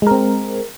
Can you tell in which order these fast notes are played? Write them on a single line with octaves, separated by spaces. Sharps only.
G#3 A#4 C4